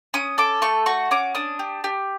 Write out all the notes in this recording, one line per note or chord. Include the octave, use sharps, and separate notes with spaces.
C#4 D#6
A4 D6
A3 C#6
F#4 C#6
C#4 D6
D4 D#6
G4
G4